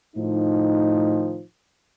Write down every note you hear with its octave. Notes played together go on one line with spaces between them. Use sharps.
A2 D#3 F3 D#4